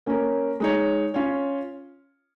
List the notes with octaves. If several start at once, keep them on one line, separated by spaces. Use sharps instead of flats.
A#3 C#4 A#4 C#5
G#3 D#4 C#5
C#4 F4 C#5